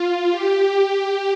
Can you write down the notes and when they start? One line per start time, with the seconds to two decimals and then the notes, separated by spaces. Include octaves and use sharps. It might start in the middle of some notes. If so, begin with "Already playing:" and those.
Already playing: F4
0.31 G4